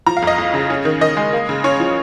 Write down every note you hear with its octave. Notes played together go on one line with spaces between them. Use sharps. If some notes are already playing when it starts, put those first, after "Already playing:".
F3 A#5
F5
F2 D#5
F2
C#3
C#4
D#3
D#3 D#5
G#3
A#3
C#3
C#4 C#5
F3